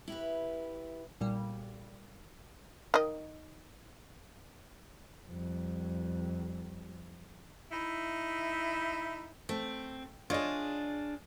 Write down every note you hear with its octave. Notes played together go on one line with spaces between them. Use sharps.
E4 G4 B4
B1 A#2 G3
D#3 D#5
F2 G3
D#4 E4
A3 C4
D4 F4 G#4 C#5 D#5